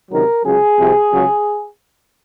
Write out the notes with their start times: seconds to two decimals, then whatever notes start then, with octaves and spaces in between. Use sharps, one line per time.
0.10 C#2 C3 D#3 F#3 A#4
0.44 C#2 C#3 F#3 G#4
0.79 C2 C3 F3
1.13 C#2 C#3 F#3